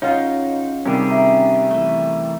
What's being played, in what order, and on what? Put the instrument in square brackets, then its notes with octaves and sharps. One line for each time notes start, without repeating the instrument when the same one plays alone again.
[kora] C#3 F4 [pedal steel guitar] D#4 [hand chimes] C#5 F#5
[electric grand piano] C3 D#3 G3 [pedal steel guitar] C#4 G4 G#4
[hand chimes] E5 A#5
[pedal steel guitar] E3 A3